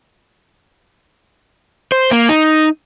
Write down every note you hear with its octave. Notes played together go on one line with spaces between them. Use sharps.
C5
A#3
D#4